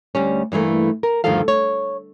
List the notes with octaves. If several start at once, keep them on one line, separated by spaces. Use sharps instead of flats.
D2 G3 C#4
G2 E3 G3 A3 A#3
A#4
D2 G2 D#3 F3 A4 F5
C#5